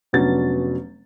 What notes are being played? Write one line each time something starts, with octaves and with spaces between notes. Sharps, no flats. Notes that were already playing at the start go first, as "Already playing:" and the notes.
F1 F#3 B3 C#4 D4 A6